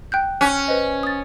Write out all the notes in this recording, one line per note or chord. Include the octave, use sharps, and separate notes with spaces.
G5 F#6 G6
C#4 F#6
B4 C5 D#5
D#6 A6